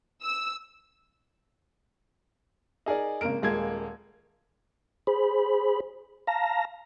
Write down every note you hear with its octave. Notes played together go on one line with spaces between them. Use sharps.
E6
D#4 G#4 A#4 D5
G#1 C#3 A#3 A#4 D7
D#1 G#3 A#3 G#6
G#4 C5 B5
F5 A5 A#5 A#6